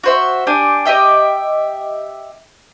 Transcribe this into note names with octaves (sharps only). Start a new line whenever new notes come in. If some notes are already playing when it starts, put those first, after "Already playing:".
F#4 C5 E5
D4 G4 G#5
G4 D#5 E5 G5